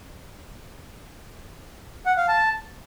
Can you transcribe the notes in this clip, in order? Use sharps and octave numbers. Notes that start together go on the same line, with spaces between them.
F#5
F5
A5